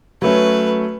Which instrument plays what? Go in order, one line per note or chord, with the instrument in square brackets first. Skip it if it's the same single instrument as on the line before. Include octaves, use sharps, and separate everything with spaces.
[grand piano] F#3 A3 C#4 [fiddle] B4